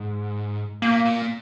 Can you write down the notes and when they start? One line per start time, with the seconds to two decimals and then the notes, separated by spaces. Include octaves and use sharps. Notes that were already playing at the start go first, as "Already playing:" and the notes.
Already playing: G#2
0.82 A#2 A#3
1.05 A#2